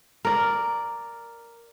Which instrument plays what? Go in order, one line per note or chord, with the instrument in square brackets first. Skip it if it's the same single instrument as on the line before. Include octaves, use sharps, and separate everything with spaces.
[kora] A#4 D5